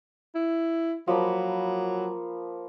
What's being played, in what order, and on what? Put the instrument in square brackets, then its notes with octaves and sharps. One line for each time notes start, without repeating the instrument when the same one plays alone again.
[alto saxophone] E4
[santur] F3 A#3 B5 [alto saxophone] F#3